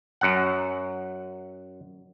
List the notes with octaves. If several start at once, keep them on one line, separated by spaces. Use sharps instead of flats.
F#2 F#5